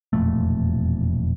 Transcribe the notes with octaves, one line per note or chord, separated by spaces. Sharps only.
E1 F2 A#2 A3